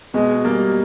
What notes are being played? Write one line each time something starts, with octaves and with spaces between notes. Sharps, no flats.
B2 G#3
G3 A#3